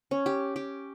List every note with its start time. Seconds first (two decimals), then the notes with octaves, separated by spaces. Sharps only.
0.11 C#4
0.26 G4
0.56 G4